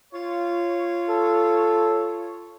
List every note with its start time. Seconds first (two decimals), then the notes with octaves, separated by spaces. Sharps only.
0.13 F4 C#5
1.09 A4